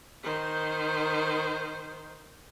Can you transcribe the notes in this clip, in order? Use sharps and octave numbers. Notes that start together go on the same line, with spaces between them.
D#3 C5